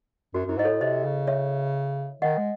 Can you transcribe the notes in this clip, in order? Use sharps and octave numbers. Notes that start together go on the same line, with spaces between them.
F#2 F#4
F#2 E4
G#2 D#5
A2 A4 C#5
C3 C5 D#5
C#3
C#5 E5
D#3 D#5 F#5
G#3